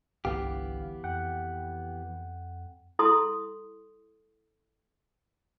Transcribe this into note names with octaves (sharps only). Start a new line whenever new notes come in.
G1 C2 E3 B3 G4 F5
F2 F#5 G5
E4 A4 C6 D#6